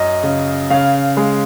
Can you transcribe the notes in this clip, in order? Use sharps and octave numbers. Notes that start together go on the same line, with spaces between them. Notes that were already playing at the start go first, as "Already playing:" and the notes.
Already playing: F#2 D#5
C#3
C#3 F5
G#3